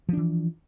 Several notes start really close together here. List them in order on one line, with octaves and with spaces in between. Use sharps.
F3 D4 E3